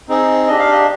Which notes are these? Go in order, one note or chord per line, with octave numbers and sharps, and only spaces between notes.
C4 D#4 G#4
D4 G4 D#5
F5
D#5